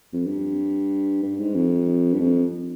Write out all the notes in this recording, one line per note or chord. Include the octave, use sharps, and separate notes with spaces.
F2
G2
G2
G#2
F2
G2
F2